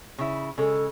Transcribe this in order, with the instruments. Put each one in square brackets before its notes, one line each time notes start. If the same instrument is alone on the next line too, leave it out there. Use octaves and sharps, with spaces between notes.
[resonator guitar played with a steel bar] C#3 E4
[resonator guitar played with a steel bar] C#3 G#3 [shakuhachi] A4